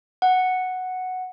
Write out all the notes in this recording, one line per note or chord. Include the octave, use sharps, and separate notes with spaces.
F#5